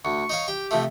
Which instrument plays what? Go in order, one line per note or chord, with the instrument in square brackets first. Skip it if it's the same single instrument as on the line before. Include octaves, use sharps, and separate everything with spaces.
[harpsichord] D2 [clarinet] C#6
[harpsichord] D#4 C#5 F5
[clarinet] G4 [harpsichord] G5
[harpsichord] C3 F3 A3